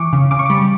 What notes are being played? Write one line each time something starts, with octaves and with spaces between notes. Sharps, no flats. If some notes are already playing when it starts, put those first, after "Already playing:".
Already playing: E3 C#6 D6
C#3
C#3 D6
C#6
G3 D6